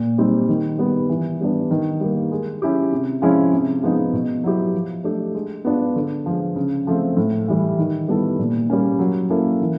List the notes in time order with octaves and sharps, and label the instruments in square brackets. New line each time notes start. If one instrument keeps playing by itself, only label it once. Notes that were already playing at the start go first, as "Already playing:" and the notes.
Already playing: [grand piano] A#2
G3 C4 D#4
D#3
G3 B3
E3
G3 B3 D4
D#3
G3 A#3
G#3
C#4 E4 G4
C3
F3 G#3 C#4 E4
C3
F3 G#3 B3 D#4
B2
F#3 B3 E4 G4
F3
A3 D4 G4
G#3
B3 D4 F4
D3
F3 G#3
C#3
F3 A3 C4
A2
E3 G3
D#3
G3 B3 E4 A4
A#2
G3 A#3 C#4
F#3
A#3 C#4 E4 A4
E3